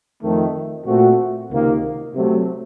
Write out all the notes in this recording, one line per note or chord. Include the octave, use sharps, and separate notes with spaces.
F2 D#3 A3
A#2 A3 C4 F#4
C#2 C3 D#3 A#3 D#4
C3 F#3 A3